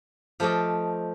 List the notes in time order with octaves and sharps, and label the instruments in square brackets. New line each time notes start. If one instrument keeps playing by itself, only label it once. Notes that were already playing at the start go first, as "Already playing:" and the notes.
[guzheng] F3 A3 F4 D5 D#5